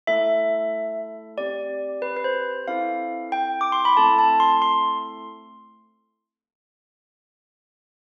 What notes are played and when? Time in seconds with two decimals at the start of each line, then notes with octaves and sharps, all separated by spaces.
0.07 A3 E4 A4 E5
1.37 C4 G4 D5
2.02 B4
2.16 B4
2.24 C5
2.67 C4 E4 A4 F5
3.32 G5
3.61 D6
3.72 C6
3.85 B5
3.97 A3 C4 E4 A4 A5
4.18 A5
4.40 C6
4.62 C6